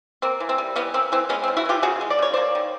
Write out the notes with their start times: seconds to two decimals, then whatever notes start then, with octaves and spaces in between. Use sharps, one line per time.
0.22 A#3 C4
0.40 E3
0.49 C4
0.58 G3
0.76 E3 B3 C#4
0.94 A#3 C4
1.12 E3 C4
1.29 G#3 B3 C#4
1.44 C4
1.48 C#3
1.57 E4 F#4
1.65 E3 F4 G4
1.83 C#3 F#4 G#4
2.01 G#3
2.10 D5
2.19 C#3 C#5
2.33 A#3 C5 D5
2.55 D#3